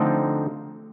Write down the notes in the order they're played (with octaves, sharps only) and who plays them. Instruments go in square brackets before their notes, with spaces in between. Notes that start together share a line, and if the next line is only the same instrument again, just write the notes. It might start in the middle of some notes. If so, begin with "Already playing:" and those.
Already playing: [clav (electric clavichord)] D3 F3 C4 D#4 [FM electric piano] A3